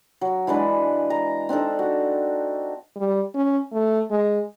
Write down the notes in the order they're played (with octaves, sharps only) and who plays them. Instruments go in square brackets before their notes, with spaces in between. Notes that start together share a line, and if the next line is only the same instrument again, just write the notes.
[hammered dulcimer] F#3
E3 G#3 D4 B4
A#5
C4 D4 D#4 A4
F#4
[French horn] G3
C#4
A3
G#3